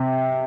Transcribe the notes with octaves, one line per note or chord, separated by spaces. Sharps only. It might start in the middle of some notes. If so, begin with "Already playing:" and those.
Already playing: C3